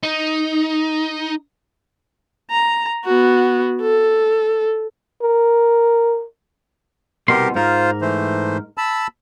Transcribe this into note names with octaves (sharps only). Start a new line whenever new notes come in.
D#4
A#5
B3 F#4
A4
A#4
C2 B2 G4 A#4 C6
G#2 F4 A#4 C5
E3 A3 C5
A5 B5 E6